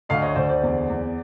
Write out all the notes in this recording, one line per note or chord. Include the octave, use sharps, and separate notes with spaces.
D2 D#5 F5
C#5 D#5
D2 C5 D5
C5 D5
E2
E2